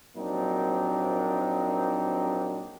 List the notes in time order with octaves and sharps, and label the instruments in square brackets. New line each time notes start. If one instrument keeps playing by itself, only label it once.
[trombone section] A#1 F#3 A#3 C4 D4 D#4